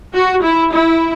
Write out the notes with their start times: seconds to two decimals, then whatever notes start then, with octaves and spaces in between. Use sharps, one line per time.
0.14 F#4
0.42 E4
0.73 E4